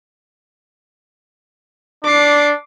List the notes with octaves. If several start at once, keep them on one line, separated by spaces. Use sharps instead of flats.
D4 D6 C7